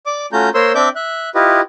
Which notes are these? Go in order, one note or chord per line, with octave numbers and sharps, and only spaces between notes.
D5 D6
A3 C#4 F4 F#4 A#5 G6
A#3 A#4 C5 C#5 C6 E6
C4 D4 D5 E5 D6 G6
E5 F#6
E4 F4 G4 B4 D#5